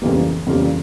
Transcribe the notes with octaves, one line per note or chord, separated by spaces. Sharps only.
F2 C#3 E3 G3 A#3
F2 C#3 E3 G3 A#3